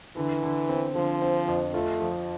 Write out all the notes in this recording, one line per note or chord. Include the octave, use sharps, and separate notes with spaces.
D3 E3
D3
C4
D3 F3
C4
F2
A3 F4
F3